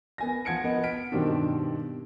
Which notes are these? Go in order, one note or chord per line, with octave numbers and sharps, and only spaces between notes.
B3 G#5 A#6
F3 F#5 G#6 C#7 D7
B3 D#5 F#5
F6 B6 D7
G2 B2 D#3 C4 D4